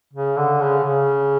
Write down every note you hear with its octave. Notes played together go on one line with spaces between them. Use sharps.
C#3
D3
C#3
C#3